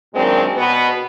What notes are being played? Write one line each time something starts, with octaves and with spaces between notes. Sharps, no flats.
F#2 A#2 D#3 G#3 C4 D4
B2 B3